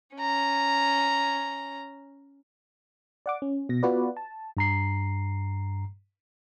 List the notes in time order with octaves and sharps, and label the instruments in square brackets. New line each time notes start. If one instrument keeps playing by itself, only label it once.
[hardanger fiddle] C#4 A#5
[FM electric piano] D5 F#5 D6
C#4
B2 A#6
B3 F4 F#4 B4 D5
A5
[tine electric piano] G2 A#5 C7